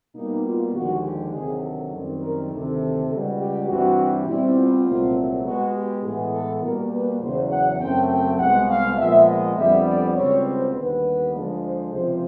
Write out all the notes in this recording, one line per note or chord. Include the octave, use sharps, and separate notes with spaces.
B2 G3 A#3 D#4
F4
D#2 D3 F3 G#3 F#4
G4
D2 C3 D#3 F#3 G#4
A4
F#2 D#3 G3 C4
A#4
D2 C3 D#3 A4
C#2 B2 G3
G4
G2 E3 G3 C4 F#4
B2 G3 C4 E4
F4
C2 A#2 F#3 A3 C4
B2 G#3 B3 F#4
G4
A2 E3 G#3 B3 G#4
A4
B2 G3 A#3 A#4
B4
E2 C#3 F#3 C5
F#5
F#2 C#3 F#3 A3 C4 G5
G5
C2 B2 G#3 F#5
F5
A#2 F3 G#3 B3 E5
D#5
F2 D3 G3 B3 E5
D5
C#2 B2 G3 C4 C#5
C5
D#2 D3 G3 B3 B4
D2 D3 F3 G#3
C5
C#2 C3 F3 C5